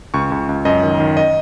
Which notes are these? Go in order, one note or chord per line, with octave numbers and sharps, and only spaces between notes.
C#2 C#6
C#2
C#2
F#2 D#5
D#3
D#3
D#5